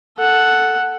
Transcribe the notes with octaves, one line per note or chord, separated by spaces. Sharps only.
A4 F#5